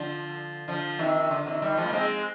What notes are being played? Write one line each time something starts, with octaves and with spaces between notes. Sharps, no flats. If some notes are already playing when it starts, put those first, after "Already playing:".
Already playing: D3 F3
D3 F3
C3 D#3
D3
C3 D#3
D#3 G3
F3 G#3
A#3
G#3 C4